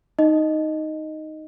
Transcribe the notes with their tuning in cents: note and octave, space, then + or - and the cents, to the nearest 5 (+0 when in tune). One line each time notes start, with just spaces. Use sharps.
D#4 +0 D#5 -5